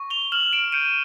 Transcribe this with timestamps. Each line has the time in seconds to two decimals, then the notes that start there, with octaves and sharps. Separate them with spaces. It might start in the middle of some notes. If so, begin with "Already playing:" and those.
Already playing: C#6
0.10 F7 G7
0.32 F6 E7 F#7
0.53 D7 E7
0.72 G6 C#7 D#7